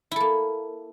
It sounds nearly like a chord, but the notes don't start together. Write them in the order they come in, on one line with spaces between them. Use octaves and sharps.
E4 A4 A#3